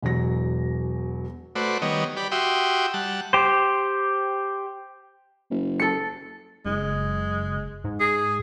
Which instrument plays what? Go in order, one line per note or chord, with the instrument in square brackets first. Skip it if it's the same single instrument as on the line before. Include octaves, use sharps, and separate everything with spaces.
[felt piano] E1 E2 B2 F#3 A#6
[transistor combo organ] A3 F#4 B4 C5 D5
D#3 G3 B3 C#5 D#5
G4 D5 B5
F#4 G4 E5 G5 C6 D#6
G3 F#5 A5
[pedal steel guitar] G4 C5
[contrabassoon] F#1
[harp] A4 C#7
[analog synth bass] F#1 [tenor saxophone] G#3
[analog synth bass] G#2
[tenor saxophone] G#4